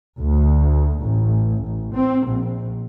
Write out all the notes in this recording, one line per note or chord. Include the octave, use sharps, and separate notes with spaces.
D2
A1
A1
C4
A#1